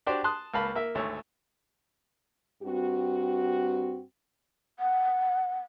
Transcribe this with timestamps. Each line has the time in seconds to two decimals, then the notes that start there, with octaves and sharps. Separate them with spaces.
0.06 D4 F#4 G4 C5 D5
0.24 A5 C6 D#6 F#6
0.54 C#2 A#3 F5 A5 B5
0.75 A#3 E5
0.95 G#1 D2 A3 C#5
2.62 G2 C4 F#4
4.79 F#5